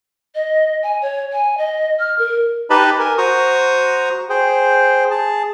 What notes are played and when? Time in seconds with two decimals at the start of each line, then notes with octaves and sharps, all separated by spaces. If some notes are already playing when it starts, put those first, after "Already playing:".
0.35 D#5
0.83 G#5
1.02 C#5
1.33 G#5
1.58 D#5
1.99 F6
2.19 A#4
2.70 D#4 G4 B4 D#5 A5 B5
3.00 A#4 G#5
3.18 F#4 C5 A#5 C#6 D#6
4.29 G#4 C5 G5
5.11 G#4 A5